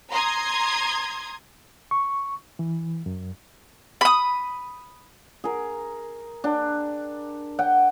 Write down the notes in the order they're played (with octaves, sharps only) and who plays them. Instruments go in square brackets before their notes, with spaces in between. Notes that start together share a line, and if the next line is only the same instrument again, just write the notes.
[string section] A#5 C6 D#6 G#6
[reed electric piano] C#6
E3
F#2
[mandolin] B5 D#6
[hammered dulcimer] G#4 A#4
D4 G5
F#5 G5